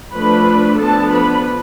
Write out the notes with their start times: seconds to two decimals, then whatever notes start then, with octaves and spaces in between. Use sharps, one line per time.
0.12 F3 A3 D4 B4 B5
0.78 F3 B3 D4 A4 A5
1.13 B4 B5